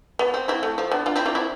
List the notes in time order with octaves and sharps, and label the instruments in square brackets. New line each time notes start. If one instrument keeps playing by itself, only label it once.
[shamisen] B3
C4
C4 E4
A3
F3
B3 D4
D4 F4
C4 E4
D4 F4
C4 E4